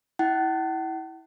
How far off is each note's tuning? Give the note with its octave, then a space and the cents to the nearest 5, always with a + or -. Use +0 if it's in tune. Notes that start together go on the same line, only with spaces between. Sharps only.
E4 -15 F#5 +45